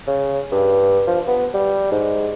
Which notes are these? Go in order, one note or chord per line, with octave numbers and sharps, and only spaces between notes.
C#3
G2
F3
B3
G3
G#2